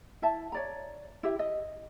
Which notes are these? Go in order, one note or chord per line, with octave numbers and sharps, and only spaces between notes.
E4 E5 A5
C#5 D5 A#5
E4 G4 E5
D#5